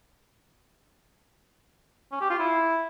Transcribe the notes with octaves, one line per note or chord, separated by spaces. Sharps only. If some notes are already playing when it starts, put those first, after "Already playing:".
C#4
G4
F4
E4